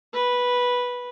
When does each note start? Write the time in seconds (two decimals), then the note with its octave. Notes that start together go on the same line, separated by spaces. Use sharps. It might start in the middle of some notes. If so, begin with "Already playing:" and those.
0.13 B4